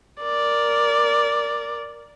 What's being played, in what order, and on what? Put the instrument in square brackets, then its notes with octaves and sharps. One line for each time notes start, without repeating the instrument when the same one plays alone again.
[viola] A#4 D5